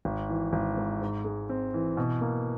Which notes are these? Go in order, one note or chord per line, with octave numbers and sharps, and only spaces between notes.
G#1
E3
G#1
G#2
G#2
G#3
C4
E3
B2
A#3